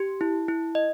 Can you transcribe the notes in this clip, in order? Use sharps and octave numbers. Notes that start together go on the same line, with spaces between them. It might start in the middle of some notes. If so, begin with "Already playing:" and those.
Already playing: G4
E4
E4
D#5